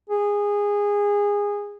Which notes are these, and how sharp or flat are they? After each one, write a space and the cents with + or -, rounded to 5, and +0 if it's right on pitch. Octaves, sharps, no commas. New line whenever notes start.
G#4 -20